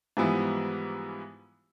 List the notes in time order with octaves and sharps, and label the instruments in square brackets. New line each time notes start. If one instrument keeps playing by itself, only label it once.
[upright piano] G#2 E3 F3 G3 B3 E4